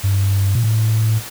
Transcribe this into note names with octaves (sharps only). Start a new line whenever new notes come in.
G2
A#2
A2